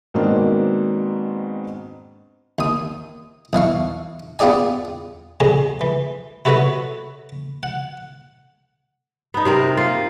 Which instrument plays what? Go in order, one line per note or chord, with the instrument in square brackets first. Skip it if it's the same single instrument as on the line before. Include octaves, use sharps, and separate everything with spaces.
[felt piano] G#2 B2 D#3 A#3 C4 D4
[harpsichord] D#2 D#6
B1 E3 F5 C#6
B3 F4 G4 G#4 D5 G#5
F2 A#2 G#4 D#5
E3
E4 F#4 A4 B4 C#5 D#5
F#5
[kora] B3 D#4
C3 C4 A#4
A#3 F4